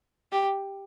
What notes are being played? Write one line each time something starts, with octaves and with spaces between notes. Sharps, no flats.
G4